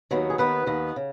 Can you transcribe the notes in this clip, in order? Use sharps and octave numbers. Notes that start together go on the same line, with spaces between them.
D#2 D#3 F#3 B3
G#4
D#2 D#3 B3 B4
D#2 D#3 B3
C#3